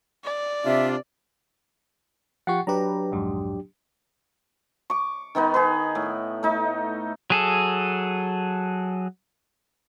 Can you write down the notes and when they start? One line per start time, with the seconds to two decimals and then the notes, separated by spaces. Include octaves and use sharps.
0.25 D5
0.65 C3 D4 F4 E5
2.47 F3 F4 G4 F#5 G5 C#6
2.67 F#3 D4 G4 B4 A#5
3.12 B1 F2 G#2
4.90 C#6 D6
5.35 D#3 B3 D#4 B4
5.54 G#4 B4
5.95 A2
6.43 A3 D#4
7.30 F#3 G#4 A4